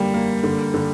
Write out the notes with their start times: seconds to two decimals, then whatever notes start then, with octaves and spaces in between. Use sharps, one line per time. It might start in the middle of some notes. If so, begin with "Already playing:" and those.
Already playing: D3 G3 A#3
0.14 A#3
0.43 D3
0.74 D3